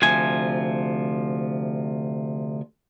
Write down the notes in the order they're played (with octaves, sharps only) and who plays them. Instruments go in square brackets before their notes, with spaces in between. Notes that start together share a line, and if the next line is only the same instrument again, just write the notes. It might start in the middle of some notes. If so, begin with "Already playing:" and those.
[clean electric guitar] D2 C3 F3 G#5